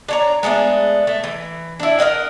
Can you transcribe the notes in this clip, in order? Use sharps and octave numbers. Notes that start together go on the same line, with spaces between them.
D4 C#5 A#5
G#3 A3 B3 D4
A3
E3
D4 E4
A#4 B4 D#5 F#5